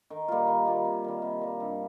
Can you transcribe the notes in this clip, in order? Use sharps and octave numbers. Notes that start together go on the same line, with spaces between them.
D#3
G3 A#3 F4
D#3
G3 A#3 F4
C3
D#3 G3
C3
D#3 G3
G2